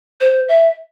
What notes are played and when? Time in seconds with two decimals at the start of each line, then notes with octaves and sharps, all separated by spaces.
0.20 C5
0.48 E5